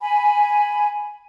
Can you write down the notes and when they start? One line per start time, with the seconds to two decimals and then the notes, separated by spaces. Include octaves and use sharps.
0.01 G#5 B5